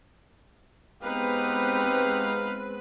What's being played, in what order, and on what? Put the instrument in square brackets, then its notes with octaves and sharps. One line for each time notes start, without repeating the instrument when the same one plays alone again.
[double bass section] G#3 B3 C4 [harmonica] D#4 F5 [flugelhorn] G4 [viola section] B4